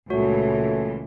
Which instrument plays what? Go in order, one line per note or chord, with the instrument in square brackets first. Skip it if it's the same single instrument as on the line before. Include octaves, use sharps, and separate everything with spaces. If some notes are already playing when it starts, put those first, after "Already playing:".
[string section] C#2 E3 [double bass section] A#2 [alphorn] A3 [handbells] F#4 C#5